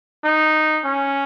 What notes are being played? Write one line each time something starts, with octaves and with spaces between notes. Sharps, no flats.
D#4
C#4